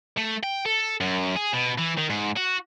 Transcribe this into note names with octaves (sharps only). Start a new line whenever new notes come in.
A3
G5
A4
F#2
G#4
B2
E3
D#3
G#2
F#4